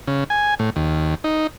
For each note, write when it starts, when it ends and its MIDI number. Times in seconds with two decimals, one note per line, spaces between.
0.07 0.24 49
0.30 0.54 80
0.59 0.70 45
0.76 1.15 39
1.24 1.47 63